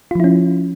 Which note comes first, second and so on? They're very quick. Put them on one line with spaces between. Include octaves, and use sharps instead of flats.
F4 F3 E4 C#4